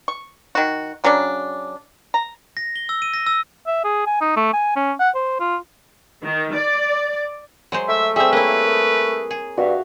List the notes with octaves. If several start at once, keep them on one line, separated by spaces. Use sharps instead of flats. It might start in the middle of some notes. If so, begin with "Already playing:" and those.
C#6
D#3 F#4
C#3 F#3 C#4 D4
A#5
A#6
G7
E6
D#7
A#6
E6
E5
G#4
G#5
D#4
A3
G#5
C#4
F#5
C5
F4
D#3
D5
F#3 G#3 C5 C6
A3 E5
G3 C4 G#4 E5
A#3 E4 A#4 B4 C#5
G#4
G2 F#4 E5 F5